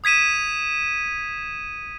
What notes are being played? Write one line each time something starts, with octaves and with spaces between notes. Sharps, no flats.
D#6 G#6 B6 D#7 E7